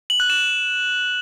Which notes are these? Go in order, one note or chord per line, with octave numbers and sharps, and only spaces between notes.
F#7
F#6
E7